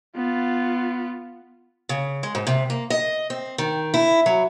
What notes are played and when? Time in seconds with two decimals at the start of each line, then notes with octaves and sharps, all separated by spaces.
0.16 B3 F4
1.89 C#3
2.23 G#3
2.35 G#2
2.47 C3
2.70 A#3
2.90 D#5
3.30 C4
3.58 D#3
3.94 E4
4.26 F#3